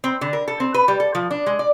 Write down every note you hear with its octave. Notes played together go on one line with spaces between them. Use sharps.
C4
D3
A#4
A4
C4
B4
G3
A4
F3
D4
G#3
D5